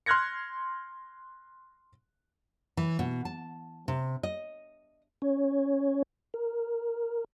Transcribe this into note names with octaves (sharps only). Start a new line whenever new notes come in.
C6 F6 F#6 G#6 A#6 C#7
E3
B2
A5
C3
D#5
C#4 C#5
A#4